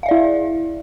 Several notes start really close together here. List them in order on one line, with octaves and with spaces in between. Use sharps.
F5 E5 D5 E4